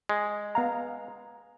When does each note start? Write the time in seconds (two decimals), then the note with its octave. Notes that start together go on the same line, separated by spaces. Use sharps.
0.09 G#3
0.55 B3 F5 A#5